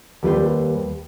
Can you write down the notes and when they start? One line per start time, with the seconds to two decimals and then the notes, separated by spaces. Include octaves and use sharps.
0.23 D#2 G3 B4 C5